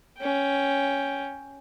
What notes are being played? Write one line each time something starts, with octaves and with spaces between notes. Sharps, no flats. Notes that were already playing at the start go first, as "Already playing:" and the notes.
C#4 G5